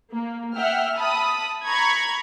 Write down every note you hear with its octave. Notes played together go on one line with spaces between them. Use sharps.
A#3
E5 F#5 G5 F6
A5 B5 D#6
A#5 B5 C#6 G#6